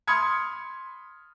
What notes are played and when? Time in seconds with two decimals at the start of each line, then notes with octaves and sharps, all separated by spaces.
0.07 B5 C6 D#6 F6 G#6 C#7